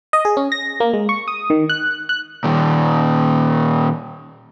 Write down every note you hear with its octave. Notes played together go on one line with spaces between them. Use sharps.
D#5
G#4
C#4
A#6
A#3
G#3
C#6
D#6
D#3
F#6
F#6
A#2 D#3